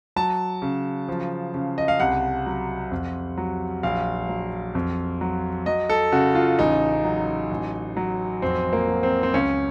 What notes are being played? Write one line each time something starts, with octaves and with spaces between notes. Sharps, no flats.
F#3 A5
C#3
F3
C#3
D#5
F5
C2 F#5
F#3
F2
F#3
A#1 F5
F#3
F2
F#3
F#3 D#5
A4
C#3 F#4
F4
A1 D#4
F#3
A1
F#3
F2 C4
A#3
F#3
C4
C4
C#2 C#4